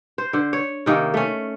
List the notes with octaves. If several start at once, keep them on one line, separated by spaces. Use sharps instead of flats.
C5
D3 C5
C#5
C3 D#3 A#3 C#4
A3 C#4